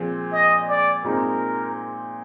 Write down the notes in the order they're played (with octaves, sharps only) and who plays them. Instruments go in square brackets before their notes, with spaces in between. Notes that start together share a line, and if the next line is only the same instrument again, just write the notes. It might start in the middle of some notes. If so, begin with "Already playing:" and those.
Already playing: [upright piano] A#2 F3 G#3 C4
[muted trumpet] D#5
D5
[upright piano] A#2 G#3 C4 D#4 [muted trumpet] A#4